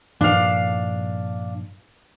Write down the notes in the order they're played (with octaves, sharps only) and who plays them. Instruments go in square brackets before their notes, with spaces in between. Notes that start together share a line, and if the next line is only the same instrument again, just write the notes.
[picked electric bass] G2 A#2 F3 [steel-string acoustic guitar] D4 F5